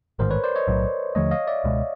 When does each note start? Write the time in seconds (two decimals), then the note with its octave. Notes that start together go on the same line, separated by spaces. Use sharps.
0.19 A1 G#2 D#3 A#4 C5
0.31 B4 C#5
0.44 C5 D5
0.56 C#5 D#5
0.68 B1 A2 F#3
1.15 D#2 D3 F3 A3 C#5 D#5
1.31 D#5 F5
1.47 D5 E5
1.64 C#2 B2 G#3